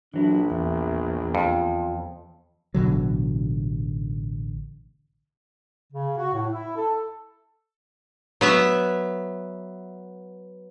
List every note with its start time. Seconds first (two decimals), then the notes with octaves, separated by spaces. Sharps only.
0.14 A#1 E3 F#3 D4 E4
0.51 E2 E5
1.35 F2 F3
2.74 A1 B2 D3 F#3
5.93 C#3
6.17 F#4
6.34 A2
6.53 E4
6.76 A4
8.41 F#3 B3 E5